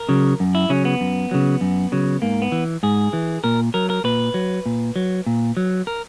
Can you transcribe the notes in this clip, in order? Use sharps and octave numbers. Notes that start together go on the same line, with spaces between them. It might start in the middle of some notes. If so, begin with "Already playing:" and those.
Already playing: A#4
C#3 F#3
F#2
E4
C#3 F#3 C#4
B3
F#2
C#3 F#3
F#2
C#3 F#3
G#2 A#3
B3
E3
G#2 G#4
E3
A#2 A#4
F#3 A#4
A#4
A#2 B4
F#3
A#2
F#3
A#2
F#3
A#4